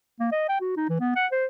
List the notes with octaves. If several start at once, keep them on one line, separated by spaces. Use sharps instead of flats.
A#3
D#5
G5
F#4
D#4
E3
B3
F#5
C5